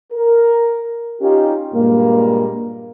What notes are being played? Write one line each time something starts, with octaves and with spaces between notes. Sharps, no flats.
A#4
C#4 D#4 F4 G4
G2 A#2 G#3 A#3